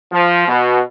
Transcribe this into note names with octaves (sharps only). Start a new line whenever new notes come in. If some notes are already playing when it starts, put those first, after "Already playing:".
F3
B2